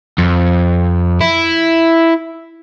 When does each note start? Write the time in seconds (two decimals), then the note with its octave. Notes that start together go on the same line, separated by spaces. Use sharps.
0.18 F2
1.21 E4